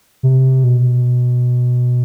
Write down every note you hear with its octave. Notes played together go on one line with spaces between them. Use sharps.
C3
B2